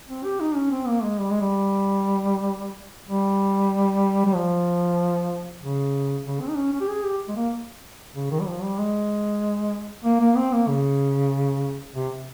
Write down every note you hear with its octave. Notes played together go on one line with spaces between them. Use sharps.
C4
G4
D#4
C#4
C4
A#3
G#3
G3
G#3
G3
G3
G3
F3
C#3
C#3
C4
D#4
C#4
C#4
G4
G#4
G4
G#3
A#3
C#3
D#3
G3
F3
G3
G#3
A#3
A#3
C4
A#3
C#3
C3